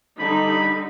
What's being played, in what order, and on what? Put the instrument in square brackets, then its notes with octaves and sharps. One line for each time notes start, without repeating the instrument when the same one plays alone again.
[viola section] D3 G3 D#4 [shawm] B5